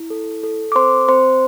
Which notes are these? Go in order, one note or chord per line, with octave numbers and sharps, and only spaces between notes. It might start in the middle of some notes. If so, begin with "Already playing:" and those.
Already playing: E4
A4
A4
D6
C4 C5 C6
C4 C5 C6